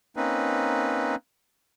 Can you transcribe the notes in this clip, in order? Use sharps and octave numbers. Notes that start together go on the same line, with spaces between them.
A#3 C4 C#4 D#4 B4